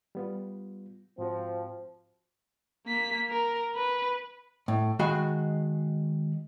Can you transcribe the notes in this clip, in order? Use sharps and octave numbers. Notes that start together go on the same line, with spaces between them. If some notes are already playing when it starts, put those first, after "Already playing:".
G3 B3 F4
G#2 F3 C4 F#4
A#3 B6
A#4
B4
A2
D#3 G#3 F#4 F5 B5